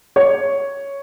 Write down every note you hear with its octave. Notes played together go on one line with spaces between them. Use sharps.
C#5